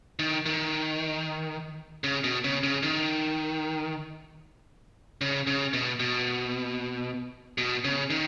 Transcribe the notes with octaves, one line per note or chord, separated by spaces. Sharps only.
D#3
D#3
C#3
B2
C#3
C#3
D#3
C#3
C#3
B2
B2
B2
C#3
D#3